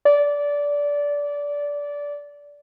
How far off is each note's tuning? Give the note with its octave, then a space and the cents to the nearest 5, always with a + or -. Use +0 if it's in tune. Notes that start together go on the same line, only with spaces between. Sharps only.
D5 -20